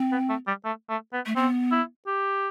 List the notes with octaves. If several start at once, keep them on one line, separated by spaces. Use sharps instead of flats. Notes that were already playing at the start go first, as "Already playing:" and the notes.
Already playing: C4
B3
A3
G3
A3
A3
B3
A3
B3 C4
E4
G4